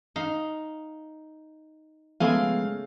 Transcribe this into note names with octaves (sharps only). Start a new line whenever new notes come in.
D#4 F5
C#3 F3 G#3 A3 B3 F5 G#5